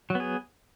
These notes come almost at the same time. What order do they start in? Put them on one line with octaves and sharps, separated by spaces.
F#3 B3 G#4